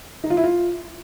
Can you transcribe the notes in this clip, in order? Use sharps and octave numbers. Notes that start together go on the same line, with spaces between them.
D#4
F4
E4
F4